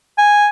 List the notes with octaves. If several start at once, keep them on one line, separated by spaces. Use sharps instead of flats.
G#5